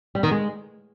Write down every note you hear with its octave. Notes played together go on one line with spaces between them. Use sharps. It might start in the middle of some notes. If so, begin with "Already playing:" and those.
G3
D#3
G#3